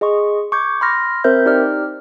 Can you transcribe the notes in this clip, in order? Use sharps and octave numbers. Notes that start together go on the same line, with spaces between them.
G#4 D#5 C6 C#6
C#6 D6 G6 G#6
B5 C6 F6 A#6
C4 A#4 C5 E5 G6
D#4 G4 D5 G5 F6